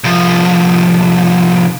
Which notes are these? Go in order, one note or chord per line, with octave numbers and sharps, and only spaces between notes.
C2 F3